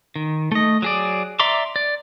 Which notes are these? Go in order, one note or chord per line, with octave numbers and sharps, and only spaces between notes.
D#3
A3 D#5
F#3 G#4 D5
D5 E5 A#5 C6 D6
D5